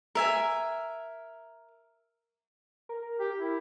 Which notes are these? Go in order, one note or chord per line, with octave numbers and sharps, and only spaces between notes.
A#4 E5 G#5
A#4
G4
E4